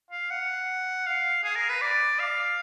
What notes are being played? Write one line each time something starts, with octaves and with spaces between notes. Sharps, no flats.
F5
F#5
F5
G#4
A#4
B4
D5
F5